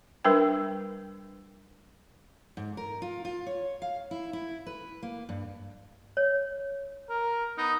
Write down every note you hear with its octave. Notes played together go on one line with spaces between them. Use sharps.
G3 D4 A#4 B4 G5
G#2
A#4
F4
F4
C#5
F5
E4
E4
B4
A#3
G2
C#5
A#4
B3 D#4